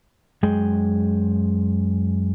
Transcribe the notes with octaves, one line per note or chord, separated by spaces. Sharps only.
F#2 G#3 G#4 G5